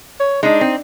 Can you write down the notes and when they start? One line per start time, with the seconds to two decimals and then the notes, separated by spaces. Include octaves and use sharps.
0.20 C#5
0.43 G#3 D4 D#4
0.61 C4